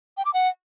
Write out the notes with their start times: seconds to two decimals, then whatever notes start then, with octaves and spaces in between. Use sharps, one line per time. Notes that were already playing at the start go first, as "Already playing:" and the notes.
0.17 G5
0.25 D6
0.34 F#5